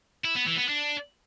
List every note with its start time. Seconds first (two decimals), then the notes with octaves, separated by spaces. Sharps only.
0.24 E4
0.35 B3
0.46 E3
0.57 B3
0.68 D4